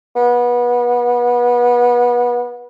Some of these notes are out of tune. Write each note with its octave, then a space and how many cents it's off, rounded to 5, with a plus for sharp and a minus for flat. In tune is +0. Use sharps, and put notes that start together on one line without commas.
B3 -25